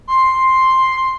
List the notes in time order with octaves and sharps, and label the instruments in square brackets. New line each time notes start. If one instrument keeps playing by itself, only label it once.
[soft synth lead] C6